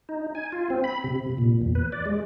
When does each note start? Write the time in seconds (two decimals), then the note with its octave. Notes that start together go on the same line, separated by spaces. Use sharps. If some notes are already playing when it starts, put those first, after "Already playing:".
0.09 D#4
0.35 G#5
0.52 F4
0.70 C4
0.84 B5
1.04 C3
1.38 A#2
1.62 E2
1.75 B4
1.92 D5
2.06 G#3